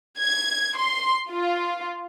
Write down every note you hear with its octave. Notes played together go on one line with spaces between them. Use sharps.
G#6
C6
F4